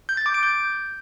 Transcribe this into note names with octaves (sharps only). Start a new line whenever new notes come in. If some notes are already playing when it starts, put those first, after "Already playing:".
G6
A6
D6
D7
G6